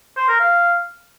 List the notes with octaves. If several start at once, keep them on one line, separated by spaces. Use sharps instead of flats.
C5
A#4
F5